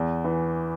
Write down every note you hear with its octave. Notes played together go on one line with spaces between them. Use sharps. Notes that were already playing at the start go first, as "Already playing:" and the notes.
Already playing: E2
E3